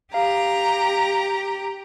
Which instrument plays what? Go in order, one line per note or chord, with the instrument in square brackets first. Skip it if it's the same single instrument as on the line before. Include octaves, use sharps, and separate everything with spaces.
[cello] G4 [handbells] F5 [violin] A#5